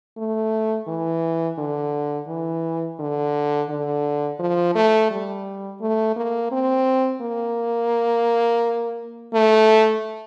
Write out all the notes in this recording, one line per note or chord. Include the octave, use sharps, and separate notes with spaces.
A3
E3
D3
E3
D3
D3
F3
A3
G3
A3
A#3
C4
A#3
A3